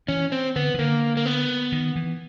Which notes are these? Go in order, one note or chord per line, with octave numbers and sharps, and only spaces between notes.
E3 C#4
C4
D3 B3
D#3
D3 A#3
A#3
B3
D#3
E3